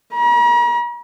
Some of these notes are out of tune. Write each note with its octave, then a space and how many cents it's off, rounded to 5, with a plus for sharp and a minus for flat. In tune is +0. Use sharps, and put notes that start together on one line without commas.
A#5 +45